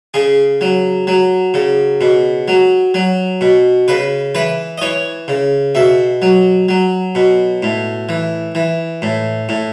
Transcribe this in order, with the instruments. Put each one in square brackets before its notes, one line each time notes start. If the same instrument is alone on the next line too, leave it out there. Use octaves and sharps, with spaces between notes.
[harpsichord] C#3 G#4
F#3
F#3
C#3
B2
F#3
F#3
B2
C#3 B4
E3 B4
D#5
E3 C#5
C#3
B2 E5
F#3
F#3
B2
A2
E3
E3
A2
A2